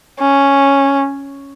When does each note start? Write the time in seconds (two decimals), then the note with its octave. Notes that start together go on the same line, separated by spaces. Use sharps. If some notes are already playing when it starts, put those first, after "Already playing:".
0.20 C#4